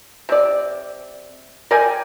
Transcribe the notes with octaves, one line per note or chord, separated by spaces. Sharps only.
C3 D5
A#4 D5 G5 G#5